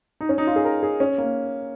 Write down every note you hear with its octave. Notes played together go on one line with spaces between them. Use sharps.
D#4
C#4
D#4
F4
G#4
A#4
G#4
C#4
A#3